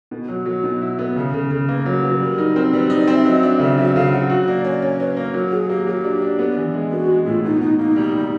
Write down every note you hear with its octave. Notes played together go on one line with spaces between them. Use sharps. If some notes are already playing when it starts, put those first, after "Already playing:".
B2
F#3
F#3
B2
E4
B3
C#3
C#3
C#3
A#3 B4
F#3
A#4
F#3 B4
G3 A#4
D#4
C4
G3 B4
D#4
D5
C4
E5
F#3 D#5
D4 E5
C#3 E5
F#3 E5
C#3 F5
F#3 F#5
F#4
A#3 D5
C#4 D5
C#4 C#5
C#4 B4
A#3 A#4
F#3
F#3 G#4
A#3 G4
F#3 G4 G#4
D4
D4
B3
E3
G#3
B3 F#4
G#3
A2 F4
B2 D#4
B2 D#4
A#3 D#4
G3
G3